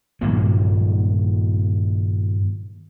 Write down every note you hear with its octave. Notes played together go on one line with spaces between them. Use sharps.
G2 A#2 D#3 F#3